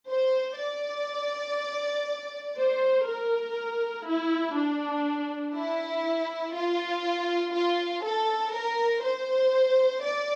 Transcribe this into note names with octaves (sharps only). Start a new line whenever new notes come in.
C5
D5
C5
A#4
E4
D4
E4
F4
F4
A4
A#4
C5
D5